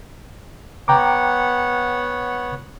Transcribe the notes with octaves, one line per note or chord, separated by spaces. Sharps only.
B3 C#5 F#5 G5 A#5 D6